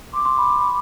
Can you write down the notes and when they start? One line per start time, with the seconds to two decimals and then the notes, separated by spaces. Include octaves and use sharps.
0.13 C6 D6
0.25 C6
0.38 B5
0.50 C6
0.61 B5